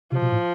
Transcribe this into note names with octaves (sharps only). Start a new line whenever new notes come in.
C3 F3
B2
A2